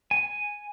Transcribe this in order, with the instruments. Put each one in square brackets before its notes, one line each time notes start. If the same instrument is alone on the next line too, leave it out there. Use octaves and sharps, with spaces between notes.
[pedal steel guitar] G#5